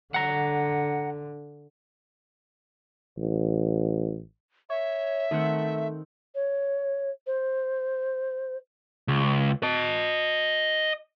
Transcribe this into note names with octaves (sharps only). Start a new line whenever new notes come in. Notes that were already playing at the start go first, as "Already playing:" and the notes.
D3 F#5 A#5
A1
C#5 E5
D#3 A3 C4 F#5
C#5
C5
C#2
D#5 A5